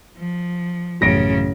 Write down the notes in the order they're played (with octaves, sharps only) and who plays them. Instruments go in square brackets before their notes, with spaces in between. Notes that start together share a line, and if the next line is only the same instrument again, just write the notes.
[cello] F3
[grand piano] A1 A#6 D7 [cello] F#2 C#3